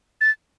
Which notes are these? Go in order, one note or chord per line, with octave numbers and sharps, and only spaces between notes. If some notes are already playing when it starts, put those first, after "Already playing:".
A6